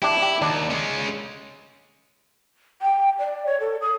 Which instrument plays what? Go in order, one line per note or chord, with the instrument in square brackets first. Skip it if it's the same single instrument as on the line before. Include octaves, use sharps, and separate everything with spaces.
[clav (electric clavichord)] D4 G4 [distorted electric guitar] E4
[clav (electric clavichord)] G4
[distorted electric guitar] D#2 [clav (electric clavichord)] D4
[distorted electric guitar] G#3 C#4
[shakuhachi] G5
D5
C#5
A4
D#6